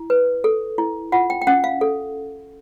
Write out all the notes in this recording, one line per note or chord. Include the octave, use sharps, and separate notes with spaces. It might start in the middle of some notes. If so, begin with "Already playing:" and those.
Already playing: E4
B4
A4
E4
F4 F#5
G5
G5
C#4 F#5
F5
A4